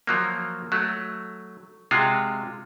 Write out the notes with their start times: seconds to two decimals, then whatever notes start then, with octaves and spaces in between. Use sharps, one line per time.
0.07 F3 F#3 A#3
0.72 F#3 A3
1.91 C3 G#3 F4 F#4